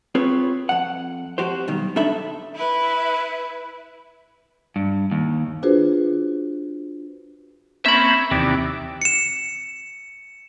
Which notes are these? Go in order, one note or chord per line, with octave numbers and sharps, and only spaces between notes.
C4 F4 G#4 B4 C#5
F2 F#5
F2 F#4 G4 C5
B1 D#3 G3
F#2 D4 D#4 A4 E5 B5
E4 B4
G2
D#2
D4 F4 F#4 G#4 B4 C5
A#3 C4 C#4 E5 B5
D#2 C3 E3 D5
C#7 E7